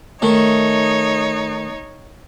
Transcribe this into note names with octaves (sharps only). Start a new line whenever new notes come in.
D#3 A3 D#4 C#5